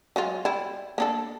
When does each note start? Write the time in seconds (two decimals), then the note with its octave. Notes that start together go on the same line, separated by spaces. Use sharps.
0.16 F#3 G#3 F4
0.45 G3 E4
0.98 A#3 D4 A4